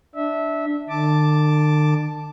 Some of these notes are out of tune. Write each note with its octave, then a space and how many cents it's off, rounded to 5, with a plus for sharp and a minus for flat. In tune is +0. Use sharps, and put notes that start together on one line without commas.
D4 +0 E5 -20
D3 +45 A5 +0 D6 +0